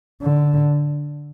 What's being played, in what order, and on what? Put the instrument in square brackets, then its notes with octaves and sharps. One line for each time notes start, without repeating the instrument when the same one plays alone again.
[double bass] D3